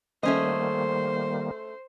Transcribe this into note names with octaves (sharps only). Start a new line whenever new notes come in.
D#3 G3 A3 A#3 C#4 C5 D#5